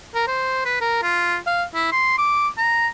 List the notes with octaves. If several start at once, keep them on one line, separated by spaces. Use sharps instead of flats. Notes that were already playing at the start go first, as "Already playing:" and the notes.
A#4
C5
B4
A#4
F4
F5
E4
C6
D6
A#5